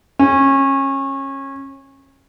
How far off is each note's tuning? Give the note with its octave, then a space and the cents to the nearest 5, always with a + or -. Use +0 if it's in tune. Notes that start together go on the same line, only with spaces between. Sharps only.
C#4 -25